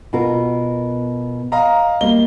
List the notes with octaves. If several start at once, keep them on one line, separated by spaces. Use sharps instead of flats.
B2 F4 A#4
D#5 F5 A#5
G3 A#3 D#5 G7